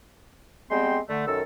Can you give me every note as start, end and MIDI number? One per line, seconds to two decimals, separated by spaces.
0.71 0.98 55
0.71 0.98 56
0.71 0.98 59
0.71 0.98 60
0.71 0.98 79
0.71 0.98 84
1.09 1.22 50
1.09 1.22 57
1.27 1.41 42
1.27 1.41 51
1.27 1.41 69
1.27 1.41 70
1.27 1.41 88